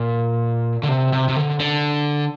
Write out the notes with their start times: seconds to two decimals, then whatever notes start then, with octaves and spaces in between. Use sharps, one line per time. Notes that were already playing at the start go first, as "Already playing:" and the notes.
Already playing: A#2
0.83 D3
0.88 C3
1.13 C3
1.29 C3
1.36 D3
1.60 D3